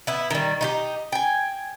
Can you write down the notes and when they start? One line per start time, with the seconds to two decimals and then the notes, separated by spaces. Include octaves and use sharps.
0.07 B3 E4
0.30 D#3 G3
0.61 D#4 F4 G4
1.12 G5 G#5